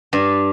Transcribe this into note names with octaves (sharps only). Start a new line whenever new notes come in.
G2